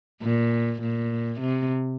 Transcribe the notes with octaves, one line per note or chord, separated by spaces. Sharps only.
A#2
A#2
C3